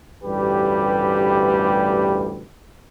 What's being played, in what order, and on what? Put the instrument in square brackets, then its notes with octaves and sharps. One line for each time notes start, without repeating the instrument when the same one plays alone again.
[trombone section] A1 D2 G2 G3 G4 B4